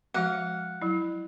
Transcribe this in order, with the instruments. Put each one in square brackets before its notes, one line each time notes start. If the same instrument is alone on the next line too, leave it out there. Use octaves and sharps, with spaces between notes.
[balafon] F3 G#3 F#4 [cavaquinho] F5 F#5
[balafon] F#3 E4